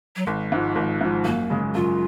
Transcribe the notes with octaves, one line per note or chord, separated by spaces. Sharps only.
F#3
G#1 G#3
G#2 F3
G#1
G#2 F3
F#2 A#3
C#3 G#3
F#2 F4